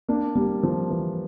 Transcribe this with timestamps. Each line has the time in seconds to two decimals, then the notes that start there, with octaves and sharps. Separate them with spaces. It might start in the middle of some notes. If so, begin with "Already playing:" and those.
0.09 A#3 D4
0.35 G3 A#3
0.63 F3
0.90 E3